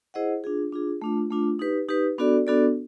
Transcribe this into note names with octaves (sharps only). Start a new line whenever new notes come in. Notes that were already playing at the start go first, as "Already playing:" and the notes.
E4 G#4 C5 D#5 F#5
D4 F4 G#4
D4 F4 G#4
A3 D4 F4
A3 D4 F4
D#4 G4 B4
D#4 G4 B4
B3 D4 F#4 A4 D5
B3 D4 F#4 A4 D5